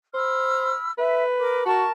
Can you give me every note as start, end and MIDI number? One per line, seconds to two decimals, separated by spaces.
0.14 0.73 72
0.14 0.90 83
0.14 0.90 88
0.14 0.90 89
0.98 1.65 71
0.98 1.24 76
1.39 1.65 70
1.39 1.65 86
1.66 1.84 66
1.66 1.91 70
1.66 1.91 81
1.66 1.91 85